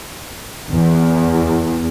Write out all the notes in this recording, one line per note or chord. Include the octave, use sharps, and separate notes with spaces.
E2